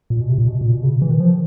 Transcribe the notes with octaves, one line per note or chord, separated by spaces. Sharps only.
A#2
B2
C3
A#2
B2
B2
A#2
B2
C#3
E3
D#3
F3